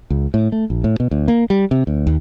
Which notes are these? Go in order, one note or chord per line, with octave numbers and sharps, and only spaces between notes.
C#2
A2
A3
A#1
A2
B2
D2
A#3
G3
C3
D2
D#2